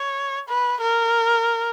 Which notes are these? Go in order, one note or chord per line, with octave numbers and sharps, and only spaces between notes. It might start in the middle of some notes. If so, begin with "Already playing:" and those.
Already playing: C#5
B4
A#4